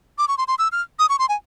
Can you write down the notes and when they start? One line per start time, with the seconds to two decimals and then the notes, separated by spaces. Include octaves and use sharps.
0.18 D6
0.28 C#6
0.38 C6
0.48 C6
0.59 E6
0.72 F6
0.99 D#6
1.09 C#6
1.19 C6
1.29 G#5